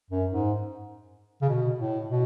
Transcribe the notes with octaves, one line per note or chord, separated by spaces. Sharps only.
F#2
G#2
C#3
B2
A2
B2